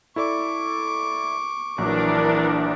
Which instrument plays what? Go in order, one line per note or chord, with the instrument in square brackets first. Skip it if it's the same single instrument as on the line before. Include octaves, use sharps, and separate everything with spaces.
[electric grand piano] E4 A4 D5 [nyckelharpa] C#6 D6
[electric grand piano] A#1 F#3 [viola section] E3 D4 A#4